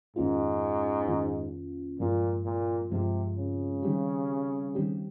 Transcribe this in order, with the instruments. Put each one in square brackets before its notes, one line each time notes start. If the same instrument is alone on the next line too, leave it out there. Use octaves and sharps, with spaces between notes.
[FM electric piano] F2 D#3 A#3 C#4 F4 [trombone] G#2
[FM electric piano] F2 D#3 A#3 C#4 F4
[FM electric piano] G2 F3 G#3 C4 F4 [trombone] A#2
[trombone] A#2
[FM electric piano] G2 F3 G#3 C4 F4 [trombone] C3
[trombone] C#3
[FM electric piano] D#3 G3 C4 G4
D#3 G3 C4 G4